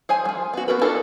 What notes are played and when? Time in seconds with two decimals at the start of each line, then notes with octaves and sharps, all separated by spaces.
0.09 G#4 C5 G#5
0.25 F3 F#3
0.54 B3 F#4
0.68 B3 F#4 A#4 B4
0.81 D4 D#4 F4 A4 A#4